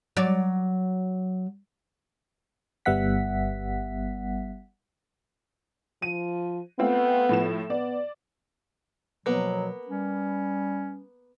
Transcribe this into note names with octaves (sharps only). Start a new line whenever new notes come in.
F#3 D5
G1 G3 B3 E5 F#5 B6
F3 D#7
A3 B3 C4 F4
A2 F3 E7
B3 D5
B2 F3 F#3 A#3 B3
G3 C#4